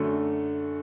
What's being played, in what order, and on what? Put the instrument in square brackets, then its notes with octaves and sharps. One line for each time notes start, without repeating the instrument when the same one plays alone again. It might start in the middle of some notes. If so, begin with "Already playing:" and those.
Already playing: [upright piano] F#2 D3 A3